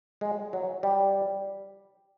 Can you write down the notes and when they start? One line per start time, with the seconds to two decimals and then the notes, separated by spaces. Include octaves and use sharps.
0.21 G#3
0.53 F#3
0.83 G3